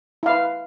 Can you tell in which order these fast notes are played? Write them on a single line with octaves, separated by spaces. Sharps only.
E4 F5 B4